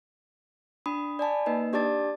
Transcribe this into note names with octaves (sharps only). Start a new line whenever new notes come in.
D4 B5 D#6
D5 G#5 A5 B5
A#3 D#4 B4 D#5
D4 G4 D5 A5 D6 A6